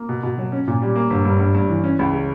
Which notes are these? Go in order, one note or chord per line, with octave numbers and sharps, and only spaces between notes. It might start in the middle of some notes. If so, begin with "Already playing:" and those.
Already playing: A#3
B2
B2
F#3
C#4
A#2
G3
A#3
G1
G2
G2
G2
E3
C#4
C#2
C#3